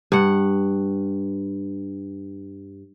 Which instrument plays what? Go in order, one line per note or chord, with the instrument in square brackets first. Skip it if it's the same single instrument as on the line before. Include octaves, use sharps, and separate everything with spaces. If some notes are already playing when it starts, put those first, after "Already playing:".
[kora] G2 F#5